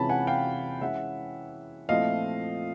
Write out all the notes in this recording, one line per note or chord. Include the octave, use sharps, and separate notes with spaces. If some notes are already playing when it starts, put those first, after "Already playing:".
Already playing: C3 E3 G#3 C#4 F4 A5 B5
F#5 G#5
F5 G5
E3 G#3 C#4 E5 F#5
A#2 F3 A3 C4 E4 D#5 F5